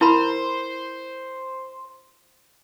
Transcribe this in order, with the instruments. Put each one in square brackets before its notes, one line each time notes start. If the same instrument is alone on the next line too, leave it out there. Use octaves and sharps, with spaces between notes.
[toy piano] E4 A#4 B5 [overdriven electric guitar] C5